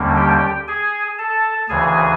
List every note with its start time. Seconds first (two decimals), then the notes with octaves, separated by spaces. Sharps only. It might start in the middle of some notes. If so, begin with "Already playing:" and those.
Already playing: D#2 D3 G3 A#3 C#4
0.17 G4 G5
0.68 G#4 G#5
1.18 A4 A5
1.69 D2 C#3 E3 G#4 G#5